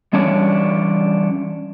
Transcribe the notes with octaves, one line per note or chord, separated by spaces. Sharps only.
E3 G3 C#4 D4 C#5 D5